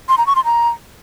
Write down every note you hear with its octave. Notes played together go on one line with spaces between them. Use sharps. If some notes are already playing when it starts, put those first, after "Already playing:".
C6
A#5
C#6
C6
A#5